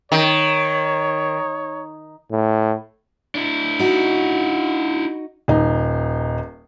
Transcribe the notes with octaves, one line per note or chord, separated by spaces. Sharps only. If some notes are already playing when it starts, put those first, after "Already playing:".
D#3 C#5
A2
D4 E4
D#4 F#4
D#1 D#4